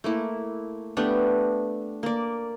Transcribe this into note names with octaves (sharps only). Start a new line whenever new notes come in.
A3 A#3 E4
A3 B3 D4 G4
A#3 D5